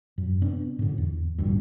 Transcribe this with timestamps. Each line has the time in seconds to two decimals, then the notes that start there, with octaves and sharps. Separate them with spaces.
0.18 F#2
0.42 C3 B3 D4
0.79 G#2 D3
0.98 E2
1.38 A1 D2 G2